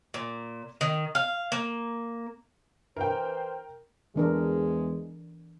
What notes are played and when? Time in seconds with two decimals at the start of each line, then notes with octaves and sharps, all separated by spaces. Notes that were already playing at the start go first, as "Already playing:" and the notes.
0.14 A#2
0.81 D#3
1.15 F5
1.52 A#3
2.97 E3 A#4 C5 G5
4.16 E2 E3 G#3 D4 A#4